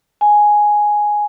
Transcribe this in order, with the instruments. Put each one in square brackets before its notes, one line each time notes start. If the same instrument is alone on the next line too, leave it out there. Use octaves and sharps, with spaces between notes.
[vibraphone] G#5